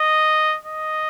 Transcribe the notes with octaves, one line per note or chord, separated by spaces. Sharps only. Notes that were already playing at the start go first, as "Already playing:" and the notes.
Already playing: D#5
D#5